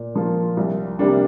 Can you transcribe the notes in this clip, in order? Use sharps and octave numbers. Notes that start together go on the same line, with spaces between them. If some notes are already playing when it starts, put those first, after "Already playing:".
Already playing: A#2
F3 A#3 F4
C2
C3 G3 A#3 D4